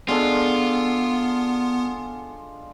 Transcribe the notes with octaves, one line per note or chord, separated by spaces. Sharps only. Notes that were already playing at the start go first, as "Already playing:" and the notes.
G#3 B3 D4 F4 A4